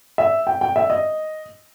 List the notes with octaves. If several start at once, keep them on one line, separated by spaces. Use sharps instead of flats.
E5
G5
G5
E5
D#5